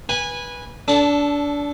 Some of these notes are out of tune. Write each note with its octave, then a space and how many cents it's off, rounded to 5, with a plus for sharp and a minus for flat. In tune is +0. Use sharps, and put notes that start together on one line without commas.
B4 -15 G#5 -15
D4 -25 A4 +0